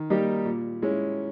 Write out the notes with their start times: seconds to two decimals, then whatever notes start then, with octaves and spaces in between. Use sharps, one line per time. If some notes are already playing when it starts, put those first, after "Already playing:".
Already playing: D#3
0.10 G3 A#3 D#4 G4
0.45 A#2
0.82 G#3 C#4 E4